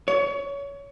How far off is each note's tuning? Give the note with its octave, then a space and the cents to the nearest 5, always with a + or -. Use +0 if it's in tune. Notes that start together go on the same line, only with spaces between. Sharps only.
C#5 +25